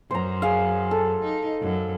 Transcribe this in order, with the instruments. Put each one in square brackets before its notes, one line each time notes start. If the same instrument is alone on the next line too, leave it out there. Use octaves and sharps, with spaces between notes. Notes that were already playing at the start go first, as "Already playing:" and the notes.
[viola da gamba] F#2 [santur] C5 A#5
[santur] G#4 F5
A4
[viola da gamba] D#4
F#2